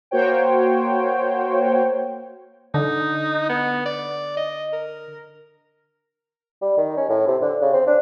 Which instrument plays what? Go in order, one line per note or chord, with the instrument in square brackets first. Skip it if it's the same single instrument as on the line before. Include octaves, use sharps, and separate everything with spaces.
[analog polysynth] A#3 F#4 C5 C#5 G5
[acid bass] D3 [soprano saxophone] D#4
[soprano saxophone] B3
D5
D#5
A#4
[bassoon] G3
D#3
C#4
A2
C3
D3
C#3
C4
D4